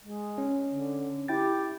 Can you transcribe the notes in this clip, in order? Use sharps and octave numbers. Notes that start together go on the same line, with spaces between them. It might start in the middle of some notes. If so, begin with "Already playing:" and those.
G#3
C#4
D3
E4 G4 G5 A6